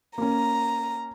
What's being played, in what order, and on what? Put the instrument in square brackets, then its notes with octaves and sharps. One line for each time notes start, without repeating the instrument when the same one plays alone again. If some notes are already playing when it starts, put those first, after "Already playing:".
[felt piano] A#3 C#4 [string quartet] A#5